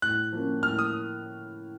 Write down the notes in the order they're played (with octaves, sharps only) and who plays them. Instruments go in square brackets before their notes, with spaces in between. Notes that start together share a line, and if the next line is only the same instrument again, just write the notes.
[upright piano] A2 [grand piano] F#6
[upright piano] F3 A#3 C#4
[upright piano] A2 [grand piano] F6
[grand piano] D#6